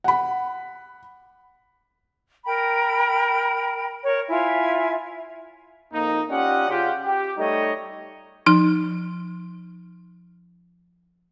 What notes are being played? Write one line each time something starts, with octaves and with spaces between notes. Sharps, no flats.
F#5 B5
A#4 G5 A#5 B5
A#4 C#5
E4 F4 E5 G#5
F2 A#3 D#4
C#4 F4 G4 D5 D#5 F#5
C#3 F4 G4
G4
G3 A3 D#4 A4 C#5 D#5
F3 D#4 F6